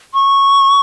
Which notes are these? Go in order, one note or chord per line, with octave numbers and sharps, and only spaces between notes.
C#6